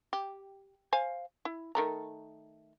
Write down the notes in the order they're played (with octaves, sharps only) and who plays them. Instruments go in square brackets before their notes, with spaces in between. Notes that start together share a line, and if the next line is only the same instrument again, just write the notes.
[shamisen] G4
C5 F5 G#5
E4
D#3 A3 A#5